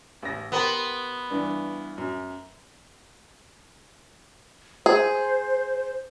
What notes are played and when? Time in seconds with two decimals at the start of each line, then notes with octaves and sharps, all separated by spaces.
0.23 A1 A#6
0.52 B3 G4 A#4 C5
1.30 G2 E3 D4
1.98 F#2
4.86 G#4 C5